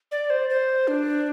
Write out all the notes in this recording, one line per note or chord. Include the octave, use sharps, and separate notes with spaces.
D5
C5
C5
D4